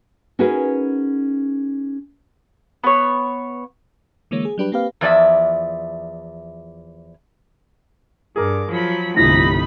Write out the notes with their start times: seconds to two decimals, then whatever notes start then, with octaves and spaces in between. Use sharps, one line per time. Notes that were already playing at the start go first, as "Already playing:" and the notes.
0.39 C#4 D#4 F#4 G#4 A#4 B4
2.84 B3 C#5
4.31 D3 E3 G#3 A#3 C#5
4.45 G#4
4.58 F#3 G3 D4 G4 B4
4.72 A#3 C4 G4 B4 F5
5.01 E2 F3 D5 E5
8.36 G2 G#4 A#4 D6
8.69 F3 F#3 B5
9.16 G1 C2 A2 F3 D#4 B5 A#6